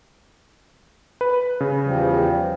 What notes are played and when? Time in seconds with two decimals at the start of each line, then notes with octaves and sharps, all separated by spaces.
1.21 B4
1.60 C#3
1.84 E2 F3 G3